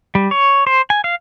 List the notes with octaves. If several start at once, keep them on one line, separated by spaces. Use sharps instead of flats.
G3
C#5
C5
G#5
F5